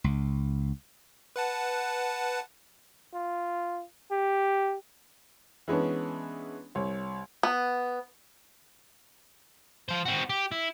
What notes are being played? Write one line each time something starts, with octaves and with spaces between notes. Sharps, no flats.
C#2
B4 F#5 A5
F4
G4
E3 G#3 B3 C#4 D4
C2 C#5
B3
F3 C5
C4 F#4
G4
E4